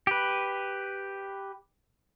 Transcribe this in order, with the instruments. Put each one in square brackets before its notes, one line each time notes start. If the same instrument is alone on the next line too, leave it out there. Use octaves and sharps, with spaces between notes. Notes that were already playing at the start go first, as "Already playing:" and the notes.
[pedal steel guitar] G4 B4